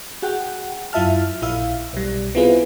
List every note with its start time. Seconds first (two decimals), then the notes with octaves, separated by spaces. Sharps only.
0.22 F#4 G#4 F#5 G5
0.93 F#2 E4 F4 E5 A5 F6
1.42 A#1 E4 E5 F5
1.93 B1 G3
2.35 B3 C4 E4 F4 G#4 B4